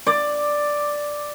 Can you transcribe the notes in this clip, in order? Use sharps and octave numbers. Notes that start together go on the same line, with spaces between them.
D5